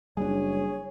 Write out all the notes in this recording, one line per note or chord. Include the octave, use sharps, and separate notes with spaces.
F#1 G3 D4 G#4 C#5